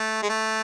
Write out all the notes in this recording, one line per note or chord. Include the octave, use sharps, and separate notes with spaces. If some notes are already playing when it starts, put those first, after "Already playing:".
Already playing: A3
G#3
A3